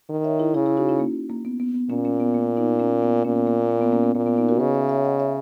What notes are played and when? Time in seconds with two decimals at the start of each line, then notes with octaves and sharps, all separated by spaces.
0.09 D#3
0.24 C#5 E5
0.40 E4 G#4
0.54 C#3 E4 G#4
0.66 E4 G#4
0.77 D#4 F#4
0.89 C#4 E4
1.00 A#3
1.30 A#3
1.45 B3
1.60 B3
1.74 B3
1.90 A#2 A#3 C#4
2.05 A#3 C#4
2.20 B3
2.35 A#3
2.57 B3 D#4
2.79 A#3 C#4
3.03 B3
3.25 A#2 A#3 C#4
3.36 B3
3.47 A#3
3.70 A#3
3.81 B3
3.92 A#3 C#4
4.03 B3
4.15 A#2 A#3
4.26 B3
4.37 B3 D#4
4.49 F#4 A#4
4.60 C#3 B4 D#5
4.75 C#5 E5
4.89 C#5 E5
5.04 D#5 F#5
5.20 C#5 E5